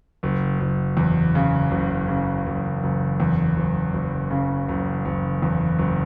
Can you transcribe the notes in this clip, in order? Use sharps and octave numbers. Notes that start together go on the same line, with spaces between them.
F#1
F#1
E2
C#3
F#1
C#3
F#1
F#1
E2
F#1
F#1
C#3
F#1
F#1
E2
F#1